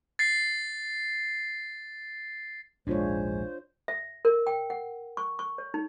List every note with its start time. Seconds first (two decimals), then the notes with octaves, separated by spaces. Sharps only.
0.19 A6 C7
2.87 A#1 D#2 G#2 G#3 D4 F4 C5 C#5
3.88 E5
4.25 A#4
4.47 G5
4.70 F#5
5.17 C#6
5.39 C#6
5.58 C#5
5.74 D#4